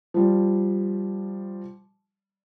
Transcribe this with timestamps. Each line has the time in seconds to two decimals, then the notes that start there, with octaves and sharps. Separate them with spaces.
0.14 F3 G3